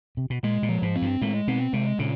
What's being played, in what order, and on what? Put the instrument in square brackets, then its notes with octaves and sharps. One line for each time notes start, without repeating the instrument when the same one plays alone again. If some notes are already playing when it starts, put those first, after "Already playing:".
[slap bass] C3
B2
[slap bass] A#2 [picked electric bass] G#3
[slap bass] A#2
[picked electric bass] F3
[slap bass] G#2
[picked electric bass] C4
[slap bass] G2
[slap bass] A2 [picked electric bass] G#3
[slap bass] B2 [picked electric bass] C4
[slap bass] C3 [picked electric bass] G#3
[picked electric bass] A#2 [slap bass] C#3